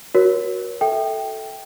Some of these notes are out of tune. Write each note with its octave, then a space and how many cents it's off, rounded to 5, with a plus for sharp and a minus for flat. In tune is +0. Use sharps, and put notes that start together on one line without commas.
F#4 +0 A#4 +35 C#5 +0
A4 +0 E5 -10 G5 +0